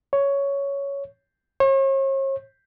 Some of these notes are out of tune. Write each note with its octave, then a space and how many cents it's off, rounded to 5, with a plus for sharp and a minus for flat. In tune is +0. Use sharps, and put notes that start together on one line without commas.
C#5 +10
C#5 -40